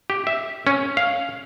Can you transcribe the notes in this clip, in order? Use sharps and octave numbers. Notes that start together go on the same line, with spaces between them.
G4
E5
C#4
F5